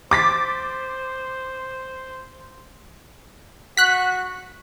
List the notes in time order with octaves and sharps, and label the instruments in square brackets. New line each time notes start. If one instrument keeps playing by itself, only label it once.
[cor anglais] C5 [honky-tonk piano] D6 A6 B6
[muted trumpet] F#4 [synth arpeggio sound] F#6 B6